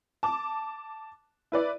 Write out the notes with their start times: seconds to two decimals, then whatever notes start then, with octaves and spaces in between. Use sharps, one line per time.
0.23 A5 D6
1.52 E4 B4 D5